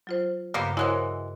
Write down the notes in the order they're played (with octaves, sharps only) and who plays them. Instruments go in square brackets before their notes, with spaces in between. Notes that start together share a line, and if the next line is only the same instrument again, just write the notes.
[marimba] F#3 F4 C5
[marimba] G2 C#3 [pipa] A#3 B3 G4
[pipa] E3 F#3 G#3 [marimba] E4 A#4 C5